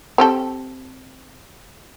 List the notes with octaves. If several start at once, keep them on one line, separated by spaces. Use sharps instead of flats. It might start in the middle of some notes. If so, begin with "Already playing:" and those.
C4 G4 A4